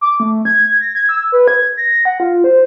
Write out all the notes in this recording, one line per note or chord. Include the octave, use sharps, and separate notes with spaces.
D6
A3
G#6
A#6
G#6
E6
B4
G#6
A#6
F#5
F4
C5